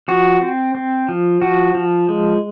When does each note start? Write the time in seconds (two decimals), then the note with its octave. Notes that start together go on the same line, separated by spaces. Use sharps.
0.08 F3 F#4
0.41 C4
0.75 C4
1.09 F3
1.42 F3 F#4
1.75 F3
2.09 G#3